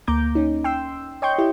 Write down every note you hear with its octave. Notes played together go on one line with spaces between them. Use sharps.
D2 A#3 A#5 D6 G6
C#4 D#4
G5 C6 E6
C#5 D#5 G5 C6 C#6 G6
E4 G4